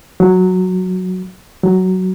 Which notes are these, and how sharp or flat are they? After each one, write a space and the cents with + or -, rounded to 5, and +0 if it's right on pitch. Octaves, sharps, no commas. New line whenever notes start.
F#3 -5
F#3 +10